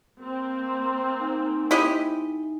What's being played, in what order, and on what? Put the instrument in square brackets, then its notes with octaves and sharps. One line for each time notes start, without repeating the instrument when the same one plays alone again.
[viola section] A#3 C4
[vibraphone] D#4 G#5
[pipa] E4 G4 D#5